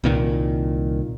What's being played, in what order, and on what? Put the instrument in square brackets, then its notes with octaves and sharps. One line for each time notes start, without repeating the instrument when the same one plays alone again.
[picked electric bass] C2 A#2 D#3